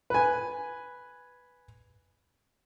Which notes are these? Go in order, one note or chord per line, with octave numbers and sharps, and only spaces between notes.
B4 G#5